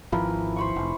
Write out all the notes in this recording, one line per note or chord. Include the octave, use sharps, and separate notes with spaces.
G#1 E3 F3 E4 A#4
C5 B5 C#6
F1